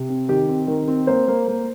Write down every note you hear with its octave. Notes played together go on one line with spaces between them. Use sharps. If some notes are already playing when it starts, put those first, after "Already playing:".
Already playing: C3
C4
D#3 G4
C4
D#3 A#4
C4
A#3 C5
A#3
A#3